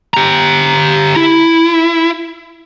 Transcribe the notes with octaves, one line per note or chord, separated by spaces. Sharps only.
G4 A#5
E4